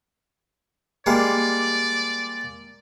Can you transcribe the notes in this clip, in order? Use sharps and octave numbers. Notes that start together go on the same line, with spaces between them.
G3 G#3 A#3 D5